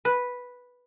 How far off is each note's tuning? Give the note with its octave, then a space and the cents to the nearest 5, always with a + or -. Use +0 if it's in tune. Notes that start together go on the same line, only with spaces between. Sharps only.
B4 -5